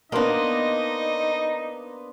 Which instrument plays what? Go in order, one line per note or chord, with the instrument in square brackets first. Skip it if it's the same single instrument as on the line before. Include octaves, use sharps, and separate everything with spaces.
[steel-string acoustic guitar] A#3 B3 [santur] D4 C5 D#6 [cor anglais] D#4 [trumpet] D#5